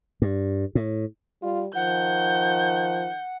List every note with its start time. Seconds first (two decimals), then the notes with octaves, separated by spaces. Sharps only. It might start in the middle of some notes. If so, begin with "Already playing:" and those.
0.22 G2
0.75 A2
1.43 G3 F4
1.75 D#3 F3 F#5 G6